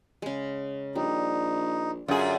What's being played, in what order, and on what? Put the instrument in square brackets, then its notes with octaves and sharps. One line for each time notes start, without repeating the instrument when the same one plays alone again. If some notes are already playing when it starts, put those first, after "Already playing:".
[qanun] C#3 G#3
[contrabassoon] A#1 [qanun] G3 [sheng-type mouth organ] D#4
[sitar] F#2 G#4 [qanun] D3 [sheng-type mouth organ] F4